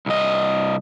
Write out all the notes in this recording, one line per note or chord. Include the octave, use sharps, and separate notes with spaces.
C2 D#5